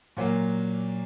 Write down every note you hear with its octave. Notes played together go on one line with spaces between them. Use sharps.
A#2 F#3 A#3